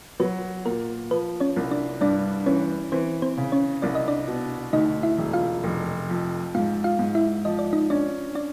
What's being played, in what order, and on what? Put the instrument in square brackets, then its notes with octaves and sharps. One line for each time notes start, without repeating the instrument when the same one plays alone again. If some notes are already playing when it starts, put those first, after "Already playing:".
[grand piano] F#3 [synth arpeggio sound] B4
[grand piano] A#2 [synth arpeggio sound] A#4
[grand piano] F3 [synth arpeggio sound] B4
[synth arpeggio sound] C#4 C#5
[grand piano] C2
[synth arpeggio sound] D4 D5
[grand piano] G2 [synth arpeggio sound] D4 D5
[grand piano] E3 [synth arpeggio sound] C#4 C#5
[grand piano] E3 [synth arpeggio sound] C4 C5
[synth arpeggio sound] C4 C5
[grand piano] C#3
[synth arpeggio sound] C#4 C#5
[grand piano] C2 [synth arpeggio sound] D5
[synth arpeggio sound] D#5
D4 D5
[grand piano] B2
[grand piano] D2 [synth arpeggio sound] D#4 D#5
[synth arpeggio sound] E4 E5
[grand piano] E1
[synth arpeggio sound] F4 F5
[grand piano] F1
F2
[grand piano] G#2 [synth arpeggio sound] F4 F5
[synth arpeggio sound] F4 F5
[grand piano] G#2
[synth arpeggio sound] E4 E5
[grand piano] F3 [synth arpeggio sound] D#5
[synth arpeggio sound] D5
D#4 D#5
[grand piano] C#4 [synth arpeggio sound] D4 D5
[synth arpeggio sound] D4 D5